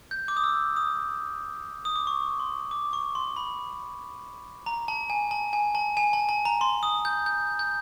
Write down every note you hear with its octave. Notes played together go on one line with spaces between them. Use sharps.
G6
D6
D#6
E6
D#6
D#6
D6
C#6
C6
D6
C#6
C6
B5
A#5
A5
G#5
A5
G#5
A5
G#5
A5
A5
A#5
C6
D#6
G6
G6
G6